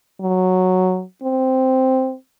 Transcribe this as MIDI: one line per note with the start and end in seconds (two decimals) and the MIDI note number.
0.20 1.03 54
1.23 2.15 60